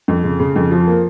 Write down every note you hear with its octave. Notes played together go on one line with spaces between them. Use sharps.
F2
C#3
C#3
F2
F3
A#3